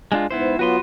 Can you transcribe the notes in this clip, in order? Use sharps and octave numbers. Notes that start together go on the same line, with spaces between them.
G#3 D4 F4
G#2 B3 E4 C5
F#3 B3 F4 F#4 B4 C6